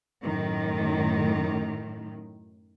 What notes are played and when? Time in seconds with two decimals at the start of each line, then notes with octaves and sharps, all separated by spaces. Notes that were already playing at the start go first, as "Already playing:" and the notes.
0.22 F#2 A2 D#3